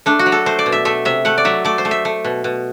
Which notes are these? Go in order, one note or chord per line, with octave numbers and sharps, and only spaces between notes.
A3 D4
F#4
F#3
A4
A3 C5
D5
B2
E5
A3 E5
C3 E5
A3 F#5
D5
F#3 E5
A3 D5
C5
A3
E5
A3
B2
B2